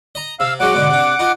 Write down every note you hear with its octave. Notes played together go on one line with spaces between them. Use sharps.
D#5 A#5
C3 F5 E6
F#3 G#3 C#4 F#5 D6
G#2 B2 D3
C3 D4
D#4 F4